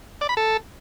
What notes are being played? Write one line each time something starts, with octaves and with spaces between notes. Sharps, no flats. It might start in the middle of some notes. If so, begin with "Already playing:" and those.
D5
B5
A4